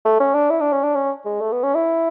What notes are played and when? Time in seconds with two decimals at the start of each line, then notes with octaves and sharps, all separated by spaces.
0.05 A3
0.20 C#4
0.34 D4
0.50 E4
0.61 D4
0.72 C#4
0.83 D4
0.95 C#4
1.25 G#3
1.41 A3
1.52 B3
1.63 C#4
1.75 E4